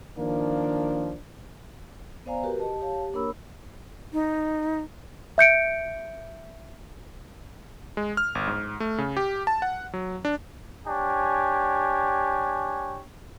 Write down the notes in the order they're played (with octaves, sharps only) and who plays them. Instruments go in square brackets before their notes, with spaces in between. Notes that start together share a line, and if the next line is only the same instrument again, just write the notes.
[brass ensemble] D#3 F3 A#3 D4
[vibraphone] B3 C5 D5 F5 G#5 A#5
F#4 G4 A#4 B4
G4 D#5 A5
G4 C#5 F5 A5
G4
A#3 D4 A#4 C#5 B5 E6
[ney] D#4
[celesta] E5 G6 C#7 D7
[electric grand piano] G#3
F6
G1
G#2
A3
C#3
G4
A5
F#5
F#3
D4
[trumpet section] D4 G4 C#5 G#5